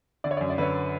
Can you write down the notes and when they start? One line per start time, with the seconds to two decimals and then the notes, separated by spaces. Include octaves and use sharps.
0.24 D3 D5
0.31 C#5
0.37 D5
0.41 F#2
0.50 D5
0.58 D3 B4 C#5